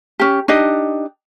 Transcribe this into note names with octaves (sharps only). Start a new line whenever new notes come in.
C#4 G4
D4 D#4 G4 D#5